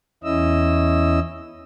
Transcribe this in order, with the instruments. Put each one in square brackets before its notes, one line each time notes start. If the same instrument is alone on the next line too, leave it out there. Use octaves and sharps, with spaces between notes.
[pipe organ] E2 C#4 E4 D#5 E6